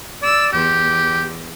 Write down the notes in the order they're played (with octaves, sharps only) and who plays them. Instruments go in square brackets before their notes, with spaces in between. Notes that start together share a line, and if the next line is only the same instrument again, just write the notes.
[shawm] D5 [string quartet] E6
[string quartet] E2 [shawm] G4